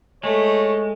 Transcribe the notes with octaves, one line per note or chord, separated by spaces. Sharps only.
G#3 A3 C#5